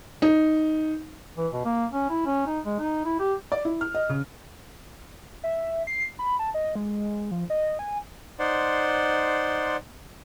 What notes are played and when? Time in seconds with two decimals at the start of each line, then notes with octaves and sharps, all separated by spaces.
0.22 D#4
1.37 E3
1.53 B2
1.65 A#3
1.92 C#4
2.10 E4
2.26 C#4
2.46 D#4
2.65 G#3
2.79 D#4
3.05 E4
3.19 G4
3.52 D5
3.65 E4
3.81 F6
3.95 D#5
4.09 C#3
5.44 E5
5.87 C7
6.19 B5
6.39 A5
6.54 D#5
6.75 G#3
7.31 F3
7.50 D#5
7.79 G#5
8.39 D#4 C5 D5 F#5 C6